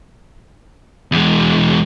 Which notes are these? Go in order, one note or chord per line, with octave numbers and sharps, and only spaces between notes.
E2 G#3